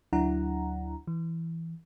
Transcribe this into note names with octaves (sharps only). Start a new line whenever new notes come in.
D2 F#3 D4 E4 F#5 A#5
E3